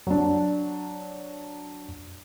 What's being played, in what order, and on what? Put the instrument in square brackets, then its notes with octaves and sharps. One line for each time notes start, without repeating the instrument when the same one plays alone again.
[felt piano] F#3 D4